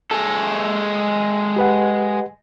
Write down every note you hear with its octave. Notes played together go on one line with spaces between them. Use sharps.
G#3 A4
G4 B4 F#5